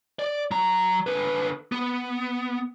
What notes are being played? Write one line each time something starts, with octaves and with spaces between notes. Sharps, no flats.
D5
F#3 A#5
D3 B4
B3